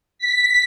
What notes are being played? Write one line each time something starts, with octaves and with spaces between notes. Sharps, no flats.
B6